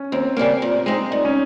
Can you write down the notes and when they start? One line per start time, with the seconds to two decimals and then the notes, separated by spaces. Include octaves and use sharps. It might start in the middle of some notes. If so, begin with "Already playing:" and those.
Already playing: C#4
0.12 D#2 C4
0.37 C#3 G3 A#3
0.62 A#2
0.86 G#3 C4 D#4
1.11 A#2 D#4
1.25 C#4